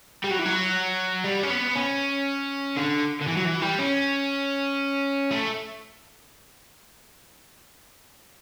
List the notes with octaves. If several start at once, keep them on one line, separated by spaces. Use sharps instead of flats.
G3
F#3
E3
F#3
G3
C#4
B3
C#4
D3
D3
E3
F#3
E3
G3
C#4
A3